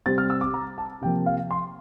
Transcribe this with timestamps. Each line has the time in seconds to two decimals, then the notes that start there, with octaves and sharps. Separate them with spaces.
0.06 C3 G3 C4 A6
0.18 F6
0.30 E6
0.41 D6
0.54 A#5
0.78 A5
1.01 C3 F3 A#3 G5
1.26 F5
1.51 C6